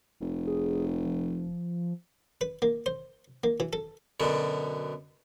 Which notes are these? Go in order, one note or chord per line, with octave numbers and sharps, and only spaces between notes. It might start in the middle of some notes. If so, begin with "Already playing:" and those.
F1
G#4
F3
B4
A#3
C5
A#3
E3
A4
F#2 B2 D3